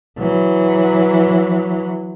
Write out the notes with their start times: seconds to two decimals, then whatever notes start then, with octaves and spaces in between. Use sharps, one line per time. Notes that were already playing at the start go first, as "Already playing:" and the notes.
0.18 E3 F#3